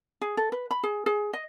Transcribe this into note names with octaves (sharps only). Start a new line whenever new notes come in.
G#4
A4
B4
B5
G#4
G#4
D#5